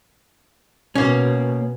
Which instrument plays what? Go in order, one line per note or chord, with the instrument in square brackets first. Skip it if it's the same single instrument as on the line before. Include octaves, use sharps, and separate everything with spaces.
[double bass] B2 [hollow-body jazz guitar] A#3 C#4